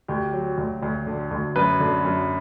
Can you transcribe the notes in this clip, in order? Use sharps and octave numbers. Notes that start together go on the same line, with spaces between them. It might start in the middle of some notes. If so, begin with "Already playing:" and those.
D2 G4
F#3
D2
D2
D3
D2
F#2 B4
D3
F#2